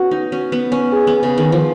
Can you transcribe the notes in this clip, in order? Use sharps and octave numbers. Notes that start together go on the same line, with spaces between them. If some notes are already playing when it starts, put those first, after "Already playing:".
Already playing: B3 C#4 F#4
D#4
C#4
B3
C#4
G#4
B3
C#3 G#4
D#3
F3